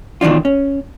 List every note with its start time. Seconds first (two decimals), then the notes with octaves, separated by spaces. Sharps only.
0.21 B2 D#3 E3 D4 F4
0.45 C#4